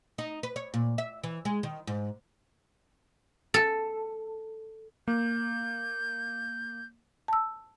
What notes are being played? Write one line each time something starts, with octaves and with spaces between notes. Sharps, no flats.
D#4
B4
C#5
A#2
E5
E3
G#3
D#3
G#2
A4
A#3 G6
A5 E6